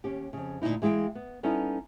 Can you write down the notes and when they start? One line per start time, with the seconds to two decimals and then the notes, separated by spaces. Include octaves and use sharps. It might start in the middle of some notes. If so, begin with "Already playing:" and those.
0.04 D#2 C#4 G4
0.33 F2 C#3
0.62 D2 A#2 C#3 D#4 E4
0.82 E3 G#3 E4 F5 G5
1.15 B3
1.43 G3 B3 C#4 D#4 E4 A4